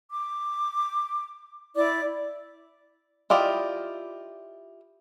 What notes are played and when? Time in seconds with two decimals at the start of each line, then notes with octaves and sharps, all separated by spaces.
0.10 D6
1.76 E4 D5 D6
3.30 E4 F4 G4 D5 D#5